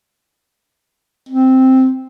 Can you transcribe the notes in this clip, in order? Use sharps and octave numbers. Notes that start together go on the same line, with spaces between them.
C4